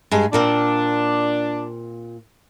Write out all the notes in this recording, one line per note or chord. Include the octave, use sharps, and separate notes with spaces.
G2 G#3
A#2 A#3 C4 D4